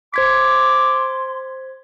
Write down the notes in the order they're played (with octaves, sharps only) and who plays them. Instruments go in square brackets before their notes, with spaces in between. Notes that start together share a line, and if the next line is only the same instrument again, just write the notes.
[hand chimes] C5 G#6 B6 [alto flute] C6 [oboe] D6